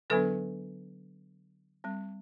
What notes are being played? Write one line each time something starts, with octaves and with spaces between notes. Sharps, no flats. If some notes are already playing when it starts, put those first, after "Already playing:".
D3 F#3 B3 D4 A4 B4
G3 C4